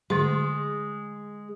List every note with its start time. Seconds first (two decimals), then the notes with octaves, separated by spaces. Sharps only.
0.10 D3 G#3 C6